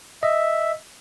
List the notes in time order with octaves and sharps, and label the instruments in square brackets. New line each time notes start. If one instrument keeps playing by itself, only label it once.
[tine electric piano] D#5 [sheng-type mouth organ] E5